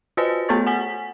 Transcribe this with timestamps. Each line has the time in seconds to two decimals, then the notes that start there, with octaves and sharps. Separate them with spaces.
0.17 F4 F#4 B4 C5 D#5
0.49 A3 B3 A4 C#5 C#6 A6
0.67 F#5 G#5 B6